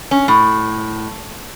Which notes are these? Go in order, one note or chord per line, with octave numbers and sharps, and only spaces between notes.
C#4
A2